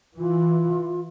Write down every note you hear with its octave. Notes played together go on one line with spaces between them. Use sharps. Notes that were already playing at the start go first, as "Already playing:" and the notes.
E3 F4